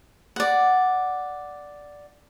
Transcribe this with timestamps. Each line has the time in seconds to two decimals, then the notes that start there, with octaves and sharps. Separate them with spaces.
0.36 D5 F#5